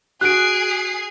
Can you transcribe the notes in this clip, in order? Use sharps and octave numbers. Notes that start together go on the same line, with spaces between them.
F#4 G#4 F#6 C7 D7